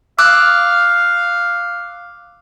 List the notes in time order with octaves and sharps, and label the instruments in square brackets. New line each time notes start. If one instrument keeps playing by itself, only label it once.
[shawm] F5 [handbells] D6 E6 F#6